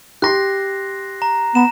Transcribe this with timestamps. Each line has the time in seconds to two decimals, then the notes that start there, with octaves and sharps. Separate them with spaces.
0.22 G4 C6 F#6 A#6 C7
1.22 A#5
1.55 B3 A#5 E7